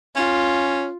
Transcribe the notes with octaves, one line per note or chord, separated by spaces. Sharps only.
C#4 F4